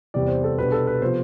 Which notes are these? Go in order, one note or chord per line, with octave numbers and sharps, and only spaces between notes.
E2 C3 G3 B3 D5
C5
A4
B2 G3 D4 B4
A4
B4
C3 F3 B3 C5